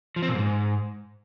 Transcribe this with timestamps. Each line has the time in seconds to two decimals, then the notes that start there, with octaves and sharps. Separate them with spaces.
0.16 F3
0.22 C4
0.29 A#2
0.35 G#2